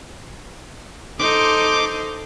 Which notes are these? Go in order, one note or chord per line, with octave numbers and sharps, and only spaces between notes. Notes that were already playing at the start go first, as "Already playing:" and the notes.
D#4 A4 C5 D6